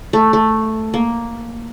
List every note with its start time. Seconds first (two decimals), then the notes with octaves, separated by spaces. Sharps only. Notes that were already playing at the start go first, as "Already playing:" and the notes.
0.13 A3
0.33 A3
0.94 A#3